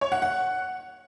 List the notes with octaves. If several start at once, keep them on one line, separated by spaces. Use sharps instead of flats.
C#5
F#5
F#5